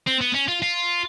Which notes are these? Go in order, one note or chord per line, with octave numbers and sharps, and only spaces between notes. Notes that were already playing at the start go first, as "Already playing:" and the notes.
C4
B3
C#4
F4
F4